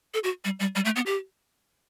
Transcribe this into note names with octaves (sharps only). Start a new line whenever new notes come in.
A4
F#4
G3
G3
G3
A3
B3
G4